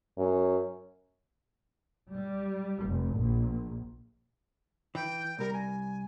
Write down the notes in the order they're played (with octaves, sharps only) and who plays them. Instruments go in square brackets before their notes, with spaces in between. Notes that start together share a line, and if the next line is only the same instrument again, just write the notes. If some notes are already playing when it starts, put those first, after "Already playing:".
[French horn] F#2
[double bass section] G3
F1
A#1
[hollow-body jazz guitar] E3 [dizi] G5
[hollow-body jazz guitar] C2 G3 [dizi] A#4
[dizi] G#5